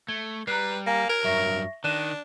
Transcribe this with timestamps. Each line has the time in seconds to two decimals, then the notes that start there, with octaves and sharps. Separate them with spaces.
0.08 A3 G#6 G7
0.47 G3 B4 A#5 F#6 C7
0.86 A#3 G#5 A#5 A#6
1.09 A#4 A#5 G#6
1.24 G2 F#3 E5 C#6 A#6
1.84 D#3 D4 F#6 D#7 E7